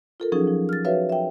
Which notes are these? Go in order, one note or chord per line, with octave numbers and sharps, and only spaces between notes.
F4 A4 A#4
F3 F#3 C#4 D#4 G#4
F3
F6 A6
F#4 B4 C#5 E5 F5
E5 G5